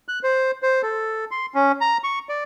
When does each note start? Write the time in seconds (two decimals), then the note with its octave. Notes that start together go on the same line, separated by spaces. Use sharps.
0.08 F#6
0.23 C5
0.62 C5
0.83 A4
1.31 C6
1.54 C#4
1.81 A#5
2.04 C#6
2.29 D5